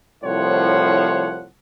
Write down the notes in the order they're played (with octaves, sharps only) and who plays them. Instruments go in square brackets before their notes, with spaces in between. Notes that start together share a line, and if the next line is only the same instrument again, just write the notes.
[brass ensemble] C2 A2 F3 C5 C#5 F#5